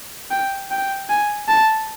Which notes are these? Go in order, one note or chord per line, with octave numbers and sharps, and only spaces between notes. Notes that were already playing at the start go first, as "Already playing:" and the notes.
G5
G5
G#5
A5